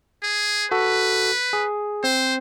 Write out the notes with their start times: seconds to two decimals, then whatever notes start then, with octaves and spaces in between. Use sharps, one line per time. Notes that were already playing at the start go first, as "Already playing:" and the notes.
0.22 G#4
0.72 F#4 A4 B4
1.53 G#4
2.04 C4 C5